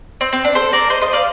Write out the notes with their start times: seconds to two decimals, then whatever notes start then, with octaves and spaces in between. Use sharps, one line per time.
0.21 C4
0.33 C4
0.45 D4
0.55 A4 C5
0.73 A#4 D5
0.90 C5 D#5
1.02 C5 D#5
1.13 D5 F5